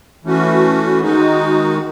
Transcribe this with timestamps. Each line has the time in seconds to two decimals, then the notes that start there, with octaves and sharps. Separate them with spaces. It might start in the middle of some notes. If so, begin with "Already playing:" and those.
0.24 E3 A3 C#4 F#4
1.01 D#3 G#3 D#4 F#4